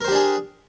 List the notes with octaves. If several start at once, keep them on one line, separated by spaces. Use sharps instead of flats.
D4 G4 G#4 A#4 C5